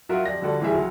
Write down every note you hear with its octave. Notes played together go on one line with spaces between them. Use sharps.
F#3 F4 F#4 A#4 E5
F2 G4 D5 A#6
D3 F3 G3 F#4 A4 D5
E3 F3 G3 G#4 E5
F#1 F3 F#3